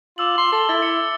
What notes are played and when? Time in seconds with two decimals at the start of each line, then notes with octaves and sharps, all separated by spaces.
0.18 F4 D6 E6 F#7
0.38 C6
0.52 A4 G7
0.69 E4 A6
0.82 C#7